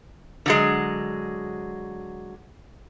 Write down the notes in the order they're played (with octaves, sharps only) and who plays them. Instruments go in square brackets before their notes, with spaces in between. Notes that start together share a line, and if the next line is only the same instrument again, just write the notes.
[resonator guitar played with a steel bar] D3 F#3 G#3